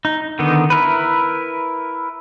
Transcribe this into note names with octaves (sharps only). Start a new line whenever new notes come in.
D#4
D3 D#3 B3 D#4
E4 A#4 B4